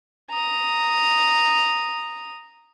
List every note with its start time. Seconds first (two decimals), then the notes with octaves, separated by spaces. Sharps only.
0.31 A#5 D#6